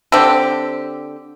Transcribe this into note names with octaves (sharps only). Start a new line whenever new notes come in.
D3 C4 G4